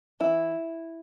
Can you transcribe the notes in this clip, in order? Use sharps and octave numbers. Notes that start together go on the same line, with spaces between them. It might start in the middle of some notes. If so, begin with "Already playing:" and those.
E3 E4